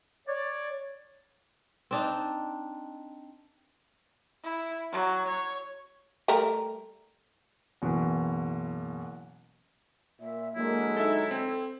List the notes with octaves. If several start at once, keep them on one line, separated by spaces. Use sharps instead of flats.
C#5 D5
C4 D4 D#4
E4
F#3
C#5
G3 A3 A#4
F#1 B2 E3
A#2 E5
D3 F#3 G#3 A#3 E4
D#4 A4 E5
C4 A4